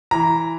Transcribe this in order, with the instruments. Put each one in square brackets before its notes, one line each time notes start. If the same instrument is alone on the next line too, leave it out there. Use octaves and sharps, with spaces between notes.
[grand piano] E3 A#5